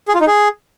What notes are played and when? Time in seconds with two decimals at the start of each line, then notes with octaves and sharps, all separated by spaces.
0.08 G#4
0.15 F4
0.21 D#4
0.27 G#4